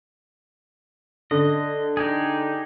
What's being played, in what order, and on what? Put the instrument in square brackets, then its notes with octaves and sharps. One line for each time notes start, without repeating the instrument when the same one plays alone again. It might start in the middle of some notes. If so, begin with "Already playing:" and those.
[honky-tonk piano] D3 [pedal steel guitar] D#5
[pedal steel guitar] D#4 G4 G#4